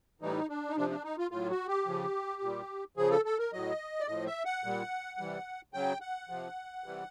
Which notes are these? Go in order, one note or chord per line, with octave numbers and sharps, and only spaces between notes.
A2 E3 G3 D#4
D4
D#4
C3 F3 D4
D4
D#4
F4
A2 F4
F#3
F#4
G4
C#3 F3
A#2 G3
C#3 F3 G#4
A4
A4
A#4
A2 F#3 D#5
D5
A2 F3 D#5
E5
F#5
A#2 G3
C3 E3 G3
C#3 F#3 G5
F#5
C3 F3
C3 E3 G3